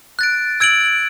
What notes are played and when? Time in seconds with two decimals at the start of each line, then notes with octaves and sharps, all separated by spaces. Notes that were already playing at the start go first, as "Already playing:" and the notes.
0.19 F#6 A6 D7
0.60 E6 G#6 D7 F#7